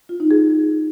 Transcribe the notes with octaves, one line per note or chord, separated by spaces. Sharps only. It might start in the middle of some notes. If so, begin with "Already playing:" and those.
F4
D#4
G#4